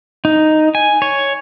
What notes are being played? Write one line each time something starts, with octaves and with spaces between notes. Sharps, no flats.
D#4
G#5
C#5